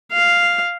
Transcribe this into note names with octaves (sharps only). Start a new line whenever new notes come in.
F5